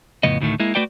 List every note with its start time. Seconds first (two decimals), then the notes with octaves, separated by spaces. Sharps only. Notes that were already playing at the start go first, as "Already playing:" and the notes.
0.23 F2 A2 C#3 B3 D#5
0.40 D2 A2 D#3 A3
0.60 G#3 A#3 E4
0.75 A3 F#4 B4 D5 G5